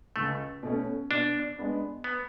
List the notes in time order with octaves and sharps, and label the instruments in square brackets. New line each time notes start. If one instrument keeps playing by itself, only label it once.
[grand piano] C#2 [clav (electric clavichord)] A3
[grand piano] B2 A3 C#4
[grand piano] B2 [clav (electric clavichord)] D4
[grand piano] G#3 B3 D4
[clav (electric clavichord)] B3